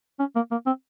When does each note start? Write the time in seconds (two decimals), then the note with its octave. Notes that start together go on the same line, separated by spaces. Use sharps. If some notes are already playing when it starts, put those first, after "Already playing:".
0.19 C#4
0.36 A#3
0.51 A#3
0.67 C4